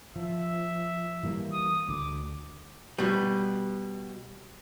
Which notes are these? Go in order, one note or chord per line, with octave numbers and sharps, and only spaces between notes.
F3 E5
E3 G3 A#3
D#6
D2 D6
B2 G3